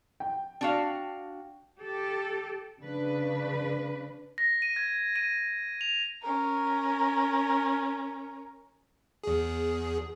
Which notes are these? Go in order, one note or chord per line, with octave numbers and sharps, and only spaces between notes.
G5
D4 F#4 F5
G4 A4
C#3 D4 B4
A#6
D#7
G#6
D#7
F7
C#4 A#4
E2 G#4